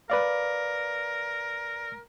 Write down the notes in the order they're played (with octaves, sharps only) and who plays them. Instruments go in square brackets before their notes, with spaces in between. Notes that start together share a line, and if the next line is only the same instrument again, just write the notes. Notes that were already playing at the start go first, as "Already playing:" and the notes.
[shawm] A#4 [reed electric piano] B4 D5 F5